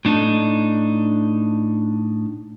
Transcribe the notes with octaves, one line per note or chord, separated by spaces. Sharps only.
A2 D4 D#4 A4